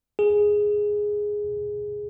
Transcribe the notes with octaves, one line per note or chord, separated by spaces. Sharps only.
G#4